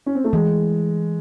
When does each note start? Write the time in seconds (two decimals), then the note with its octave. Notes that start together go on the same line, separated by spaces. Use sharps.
0.06 C#4
0.15 C4
0.24 A3
0.33 E3 G#3